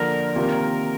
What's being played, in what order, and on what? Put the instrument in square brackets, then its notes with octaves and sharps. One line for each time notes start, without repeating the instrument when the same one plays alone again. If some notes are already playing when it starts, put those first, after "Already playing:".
Already playing: [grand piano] D3 F3 A#3 [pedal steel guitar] A#4
[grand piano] C3 D#3 A#3 F4